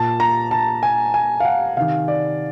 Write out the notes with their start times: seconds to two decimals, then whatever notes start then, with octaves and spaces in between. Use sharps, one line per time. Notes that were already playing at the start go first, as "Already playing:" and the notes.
Already playing: A#2 A5
0.20 A#5
0.51 A5
0.83 G#5
1.14 G#5
1.40 F5
1.45 F#5
1.76 C3 D#3 F5
2.08 D5